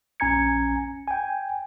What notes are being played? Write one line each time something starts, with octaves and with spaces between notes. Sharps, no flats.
A#1 C#4 G#5 A#5 G#6 C#7
G5 G#5